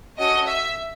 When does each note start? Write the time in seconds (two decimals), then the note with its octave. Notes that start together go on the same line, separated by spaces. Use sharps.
0.18 C#4 F#4 A4 D#5
0.46 E5